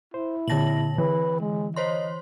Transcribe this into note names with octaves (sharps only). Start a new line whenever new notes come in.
E4 C5
A#2 D3 A5 A#6 F#7
D3 E3 B4
G#3
C5 C#5 D#5 C6